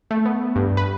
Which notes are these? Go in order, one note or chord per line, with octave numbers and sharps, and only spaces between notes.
A3
B3
G2
B4